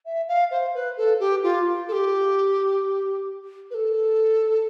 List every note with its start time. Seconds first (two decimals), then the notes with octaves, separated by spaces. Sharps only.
0.05 E5
0.28 F5
0.51 C5
0.74 B4
0.97 A4
1.19 G4
1.43 F4
1.88 A4
1.92 G4
3.70 B4
3.74 A4